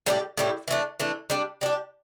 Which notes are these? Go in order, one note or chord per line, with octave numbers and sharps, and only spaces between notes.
A2 G3 E4 G4
A2 G3 E4 G4
E3 A3 D4
E3 A3 D4
G3 D4 G4
G3 D4 G4